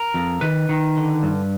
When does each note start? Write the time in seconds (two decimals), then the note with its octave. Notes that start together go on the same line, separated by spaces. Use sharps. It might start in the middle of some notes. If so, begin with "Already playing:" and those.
Already playing: A#4
0.14 F2
0.41 D#3 B4
0.69 D#3
0.97 D3
1.23 G2